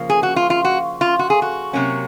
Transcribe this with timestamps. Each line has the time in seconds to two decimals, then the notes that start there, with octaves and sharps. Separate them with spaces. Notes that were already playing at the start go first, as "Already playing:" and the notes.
Already playing: C#3 F3 A#3
0.10 G#4
0.23 F#4
0.36 F4
0.50 F4
0.64 F#4
1.01 F4
1.19 F#4
1.30 G#4
1.42 F#4
1.73 C3 F#3 A#3 C#4